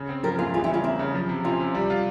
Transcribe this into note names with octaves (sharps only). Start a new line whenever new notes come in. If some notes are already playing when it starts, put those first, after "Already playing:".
Already playing: C#3
C4
F3 G4 A#4
E2 F4 G#4
G3 F4 G#4
E4 G4
C#3 C#4 F4
A#3 C4 E4
C#3
F3
C3
C4 C#4 F4
C3
G3
F4